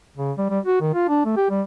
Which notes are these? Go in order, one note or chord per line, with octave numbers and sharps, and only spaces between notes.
C#3
G3
G3
F#4
D#3
F4
D4
A3
G4
G3